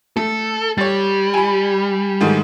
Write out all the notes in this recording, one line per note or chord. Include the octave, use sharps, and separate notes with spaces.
A3 A4
G3 C#5 A6
G#5 B5
G#2 D#3 A3